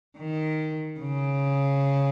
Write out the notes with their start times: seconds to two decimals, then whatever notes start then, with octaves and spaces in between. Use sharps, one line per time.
0.18 D#3
1.00 C#3